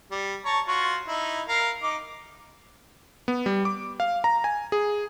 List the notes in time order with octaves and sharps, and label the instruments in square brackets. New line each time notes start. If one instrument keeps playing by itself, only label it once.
[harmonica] G3
C#5 A5 A#5
F4 F#4 C#5
D#4 E4
A#4 F5
D#4 D6
[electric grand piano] B3
G3
D6
F5
A#5
G#5
G#4